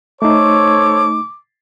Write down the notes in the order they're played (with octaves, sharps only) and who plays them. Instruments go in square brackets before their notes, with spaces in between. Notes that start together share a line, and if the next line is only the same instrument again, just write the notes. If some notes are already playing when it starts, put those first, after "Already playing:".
[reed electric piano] A3 D#4 [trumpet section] A4 C5 C#5 [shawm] D6